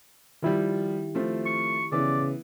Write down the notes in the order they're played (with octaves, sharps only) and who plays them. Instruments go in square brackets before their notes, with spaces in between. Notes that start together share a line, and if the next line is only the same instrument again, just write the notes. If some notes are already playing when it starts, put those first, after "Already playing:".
[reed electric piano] D#3 E4 G4 [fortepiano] F3 G3
[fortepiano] F3 A3 C4
[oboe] C#6
[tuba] C#3 [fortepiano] E3 B3 [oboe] D5